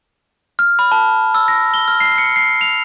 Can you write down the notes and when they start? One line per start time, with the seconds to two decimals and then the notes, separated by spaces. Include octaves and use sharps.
0.59 F6
0.79 B5
0.92 A5
1.34 E6
1.48 A#6
1.74 G7
1.88 F6
2.00 C7
2.18 C#7
2.36 C7
2.61 F7